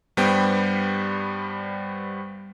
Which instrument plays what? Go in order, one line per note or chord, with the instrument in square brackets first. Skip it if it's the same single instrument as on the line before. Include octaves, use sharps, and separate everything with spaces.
[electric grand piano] G2 G3 B3 C5 G5